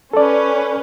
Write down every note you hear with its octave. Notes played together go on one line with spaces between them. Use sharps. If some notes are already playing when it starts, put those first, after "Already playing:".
C#4 A4 B4 D5